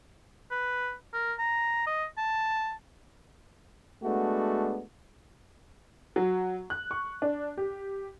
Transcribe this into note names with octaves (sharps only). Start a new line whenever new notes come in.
B4
A#4
A#5
D#5
A5
G#3 A3 B3 D4 F#4
F#3
F#6
C#6
D4
G4